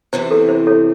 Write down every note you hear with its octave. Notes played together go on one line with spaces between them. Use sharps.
E2 C3 E3 C4 C5
A4
C5
A4 C#5